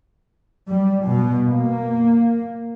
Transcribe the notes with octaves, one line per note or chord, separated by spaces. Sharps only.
G3
B2
A#3